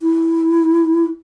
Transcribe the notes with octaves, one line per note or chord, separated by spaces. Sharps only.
E4